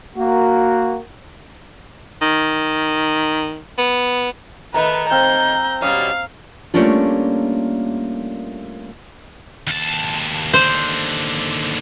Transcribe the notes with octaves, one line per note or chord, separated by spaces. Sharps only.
A#3 F#4
D#3
B3
D#3 A3 D#4 B4 A#5
C4 F5 A#5 G6
B2 G3 C#4 F5 D#6
G3 A3 A#3 C#4 D4 F4
D#2 A5
D#2 D3 C5